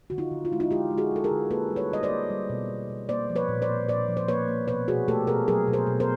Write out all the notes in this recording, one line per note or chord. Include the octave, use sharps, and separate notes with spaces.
D3 F#4
D#4 F4
D3
F4
G#3 E4
D#4 F4
G#3 F4 G4
G#3
F#4 G#4
G#3 A4
G#4 A#4
D3
A#3 A4 B4
G3
B4 C#5
G3 D#5
C5 D5
A#3
G3
B2
B2
B2
A#3 C5 D5
F3
B4 C#5
A#2
C5 D5
A#3
A#2 C5 D5
F3
C5
A#3 B4 C#5
A#3
B2 B4 C#5
B2 F#4 G#4
A3 G4 A4
B2 G#4 A#4
F#3 G#4 A#4
B2
A#4 C5
B2
A#4 C5